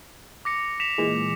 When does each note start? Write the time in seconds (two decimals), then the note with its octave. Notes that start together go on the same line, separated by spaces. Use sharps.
0.45 D6 A#6 C#7
0.80 B6 E7 F7
0.98 A#2 E3 G#3